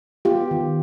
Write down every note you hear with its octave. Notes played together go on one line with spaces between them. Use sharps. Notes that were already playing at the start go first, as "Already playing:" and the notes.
B3 F4 G4
D#3